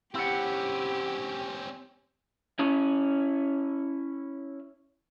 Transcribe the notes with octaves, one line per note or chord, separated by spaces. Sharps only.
C4 C#4 E4 G4 F#5
C#4 E4